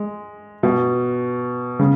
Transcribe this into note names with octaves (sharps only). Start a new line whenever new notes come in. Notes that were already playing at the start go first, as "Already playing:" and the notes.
Already playing: G#3
B2
C#3